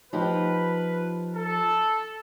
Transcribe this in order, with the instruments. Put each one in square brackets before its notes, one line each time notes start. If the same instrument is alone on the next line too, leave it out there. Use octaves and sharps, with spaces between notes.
[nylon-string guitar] F3 D#4 G4 [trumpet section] B4
[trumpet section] A4